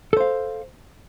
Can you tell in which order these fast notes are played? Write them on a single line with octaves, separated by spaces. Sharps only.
A4 C5 F5